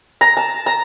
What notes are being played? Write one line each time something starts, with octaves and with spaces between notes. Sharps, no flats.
A#5
A5
A#5